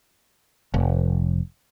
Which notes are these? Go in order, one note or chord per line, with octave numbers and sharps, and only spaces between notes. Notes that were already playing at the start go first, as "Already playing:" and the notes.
F1